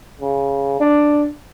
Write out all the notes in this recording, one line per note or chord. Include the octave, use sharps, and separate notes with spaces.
C#3
D4